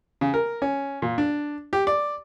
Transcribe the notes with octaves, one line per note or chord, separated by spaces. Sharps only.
C#3
A#4
C#4
A#2
D4
G4
D5